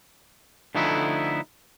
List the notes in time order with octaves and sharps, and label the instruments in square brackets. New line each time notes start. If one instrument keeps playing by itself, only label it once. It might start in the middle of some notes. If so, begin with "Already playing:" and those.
[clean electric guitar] D3 F3 A3 B3 D#4 E4